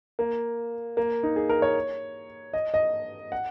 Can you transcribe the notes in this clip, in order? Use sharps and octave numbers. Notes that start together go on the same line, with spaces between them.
A#3
A#3
D#4
G#4
A#4
C#5
D#5
D#5
F#5